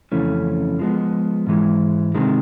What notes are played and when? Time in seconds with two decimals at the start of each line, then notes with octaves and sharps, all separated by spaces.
0.12 F2 C#3 E3 A3 C#4
0.79 F3 G#3 B3
1.47 G#2 E3 G#3
2.15 C3 D#3 G#3